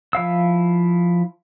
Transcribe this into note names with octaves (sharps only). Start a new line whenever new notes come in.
F3 E4 F5 E6